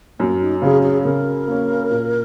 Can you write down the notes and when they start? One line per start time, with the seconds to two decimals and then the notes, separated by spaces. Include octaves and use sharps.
0.19 F#2 A#3
0.41 D#4
0.62 C#3 F#3 C#4 G#4
0.83 G#4
1.05 C#3 A#4
1.47 A#3 C#4
1.90 A#2